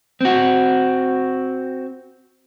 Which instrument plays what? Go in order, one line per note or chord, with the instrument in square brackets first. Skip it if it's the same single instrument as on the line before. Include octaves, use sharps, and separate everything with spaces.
[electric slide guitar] C4 F#4